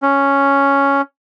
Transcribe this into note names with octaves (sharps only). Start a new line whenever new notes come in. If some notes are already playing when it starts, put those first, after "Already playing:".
C#4